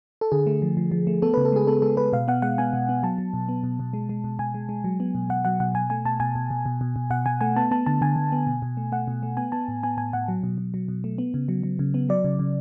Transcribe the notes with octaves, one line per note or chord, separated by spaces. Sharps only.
A4
D3 G#4
A3
F3
F3
F3
A3
B3 A4
C#3 B4
A4
G#3 G#4
B3 A4
G#3 A4
G#3 B4
B2 F5
B3 F#5
G#3 F#5
B3 G#5
B2
B3
F#3 A5
F#3
B2
B3
B2
B2
G#3
G#3
B2
B2 G#5
G#3
G#3
F#3
B3
B2
B2 F#5
F#3 F#5
B2 F#5
B2 G#5
A3 G#5
B2 A5
B2 G#5
B2
B2
B2
B2
B2
B2 F#5
B2 G#5
A3 G#5
B3 A5
B3 A5
D3 A5
D3 G#5
D3
B3
B2
B2
A3
A3 F#5
B2
A3
B3 G#5
B3 A5
A2
B3 G#5
A2 G#5
A2 F#5
F#3
B2
B2
F#3
B2
A3
B3
C#3
F#3
F#3
C#3
B3
F#3 D5
C#3
C#3